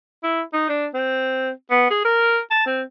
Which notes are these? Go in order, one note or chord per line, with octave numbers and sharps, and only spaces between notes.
E4
D#4
D4
C4
B3
G#4
A#4
A5
C4